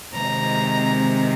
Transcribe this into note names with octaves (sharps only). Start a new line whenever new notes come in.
C3 D#3 G#3 C4 A#5